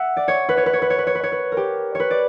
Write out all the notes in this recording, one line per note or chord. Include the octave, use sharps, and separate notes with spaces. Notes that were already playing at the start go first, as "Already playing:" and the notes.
Already playing: E5 F#5
D5
C#5
B4
C#5
B4
C#5
B4
C#5
B4
C#5
B4
C#5
B4
A#4
G4
B4 C#5
D5